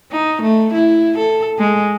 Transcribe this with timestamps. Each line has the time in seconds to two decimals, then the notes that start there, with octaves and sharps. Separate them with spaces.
0.12 D#4
0.42 A3
0.73 E4
1.18 A4
1.59 G#3